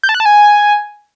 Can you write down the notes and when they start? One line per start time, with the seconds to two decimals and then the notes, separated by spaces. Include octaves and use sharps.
0.03 G6
0.09 A5
0.14 F#6
0.20 A5
0.25 G#5